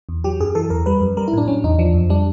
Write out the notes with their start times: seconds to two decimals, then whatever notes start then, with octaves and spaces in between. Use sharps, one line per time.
0.09 E2
0.24 F#3 G4
0.40 F#2 G#4
0.55 E3 A4
0.70 E2 A#4
0.86 G3 B4
1.01 F#2
1.17 G3 A#4
1.28 E4
1.33 A2 D4
1.47 F#3 C#4
1.64 E2 D#4
1.78 F3 D4
1.94 F2
2.10 G3 D4